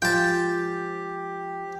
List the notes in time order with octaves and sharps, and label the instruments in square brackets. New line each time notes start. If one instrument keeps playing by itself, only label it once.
[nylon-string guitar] F3 G#3 [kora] F4 [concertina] G4 [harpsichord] G5 A5